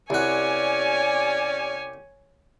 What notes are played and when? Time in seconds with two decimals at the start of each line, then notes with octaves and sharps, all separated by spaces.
0.10 C2 C#4 F#4 G4 C#5 D5 G#5